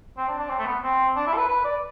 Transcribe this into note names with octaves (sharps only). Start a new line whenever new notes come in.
C4
D4
D4
C4
A3
B3
C4
D4
E4
A4
B4
B4
D5